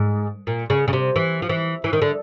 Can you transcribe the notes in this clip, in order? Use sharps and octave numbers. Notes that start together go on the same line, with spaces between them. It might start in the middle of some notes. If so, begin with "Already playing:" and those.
Already playing: G#2
A#2
C#3
C#3
C3
E3
F3
E3
E3
D#3
D3